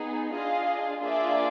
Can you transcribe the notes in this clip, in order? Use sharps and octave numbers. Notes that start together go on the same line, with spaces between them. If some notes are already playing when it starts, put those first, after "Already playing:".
Already playing: B3 D#4 G#4
D4 F4 G#4 D#5 F5
A#3 D4 F4 G#4 D5 E5